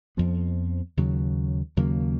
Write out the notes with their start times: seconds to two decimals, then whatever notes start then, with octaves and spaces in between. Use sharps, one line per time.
0.17 F2 F3 B3
0.97 D#2 C#3 F#3
1.77 D#2 C#3 F#3 A#3